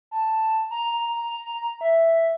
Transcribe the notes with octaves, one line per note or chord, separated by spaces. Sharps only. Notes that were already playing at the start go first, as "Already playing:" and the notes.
A5
A#5
E5